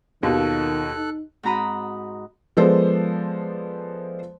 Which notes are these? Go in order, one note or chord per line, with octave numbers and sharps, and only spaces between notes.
D#2 B2 D#3 F4 A4 F#6
D#4
G#2 C4 F#4 A#5 B5 D#6
F3 G#3 B3 A4 C5 D5